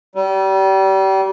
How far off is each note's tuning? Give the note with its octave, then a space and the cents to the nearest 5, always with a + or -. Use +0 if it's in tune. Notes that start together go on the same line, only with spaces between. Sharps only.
G3 -30